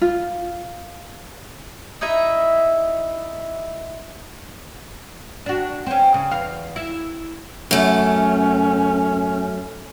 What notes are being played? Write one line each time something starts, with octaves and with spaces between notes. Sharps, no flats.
F4
D#4 E4 D#5 E5
D4 F#4
C4 C#4
C#3
E2 F5
E4
F#2 A3 C#4